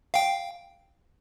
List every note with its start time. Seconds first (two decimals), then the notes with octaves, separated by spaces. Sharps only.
0.14 F5 G5